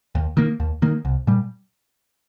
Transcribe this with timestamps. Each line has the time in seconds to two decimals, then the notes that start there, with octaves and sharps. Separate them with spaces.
0.15 D#2
0.37 D#3 A#3
0.60 D#2
0.82 D#3 A#3
1.05 C2
1.27 A#2 G3